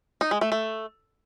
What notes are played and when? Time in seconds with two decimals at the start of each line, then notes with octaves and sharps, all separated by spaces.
0.21 D#4
0.31 G#3
0.41 A3
0.52 A3